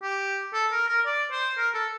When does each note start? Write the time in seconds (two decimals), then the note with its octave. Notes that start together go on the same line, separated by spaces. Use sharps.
0.03 G4
0.54 A4
0.72 A#4
0.89 A#4
1.06 D5
1.32 C5
1.58 A#4
1.75 A4